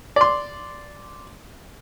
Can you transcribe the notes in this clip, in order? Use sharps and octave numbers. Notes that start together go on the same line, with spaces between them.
D5 C6